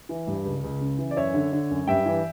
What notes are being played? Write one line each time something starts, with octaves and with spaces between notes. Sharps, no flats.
E3
G2
C#2
C#2
C#3
E3
D5
F#2 C#5 E5
D3
D3
F#2
G2 E5 G5
E3